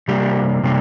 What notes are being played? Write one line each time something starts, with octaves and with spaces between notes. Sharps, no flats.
C3 G3 A#3 G4
C3 G3 A#3